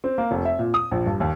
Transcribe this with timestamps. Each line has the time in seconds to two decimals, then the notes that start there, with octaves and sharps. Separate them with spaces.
0.04 C4
0.18 A#3
0.31 F1
0.45 E5
0.59 A#2
0.74 D#6
0.91 A#1
1.06 G2
1.20 D#2